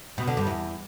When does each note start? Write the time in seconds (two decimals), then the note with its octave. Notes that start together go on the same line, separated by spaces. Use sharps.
0.18 B2
0.28 D3
0.37 G2
0.47 E2